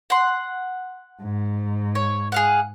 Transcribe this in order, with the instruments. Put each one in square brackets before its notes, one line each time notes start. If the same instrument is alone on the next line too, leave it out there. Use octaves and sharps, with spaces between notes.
[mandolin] F#5 C6
[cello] G#2
[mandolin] C#5
G#4 F5 F#5